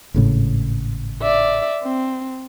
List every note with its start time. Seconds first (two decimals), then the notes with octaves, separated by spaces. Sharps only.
0.14 G#1 A2 C#3
1.22 D5 E5
1.83 C4